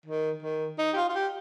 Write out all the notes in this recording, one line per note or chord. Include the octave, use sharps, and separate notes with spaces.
D#3
D#3
D#4
G4
F4
F4
G4